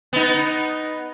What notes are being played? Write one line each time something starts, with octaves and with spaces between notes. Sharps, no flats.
B3 D#4